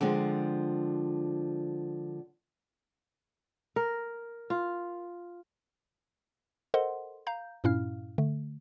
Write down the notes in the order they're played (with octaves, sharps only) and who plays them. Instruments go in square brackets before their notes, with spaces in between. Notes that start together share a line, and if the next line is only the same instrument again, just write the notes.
[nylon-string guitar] D3 F3 G#3 C4
[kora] A#4
F4
[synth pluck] A4 A#4 C5 D#5 F#5 C6
F5 A#5 G6
G2 A#2 C#4 E4 F5 F6
D3 A3